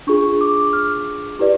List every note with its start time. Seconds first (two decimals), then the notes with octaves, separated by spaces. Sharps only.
0.07 D4 F4 G#4 C#6
0.41 D6
0.73 F6
1.39 E4 G4 B4 D5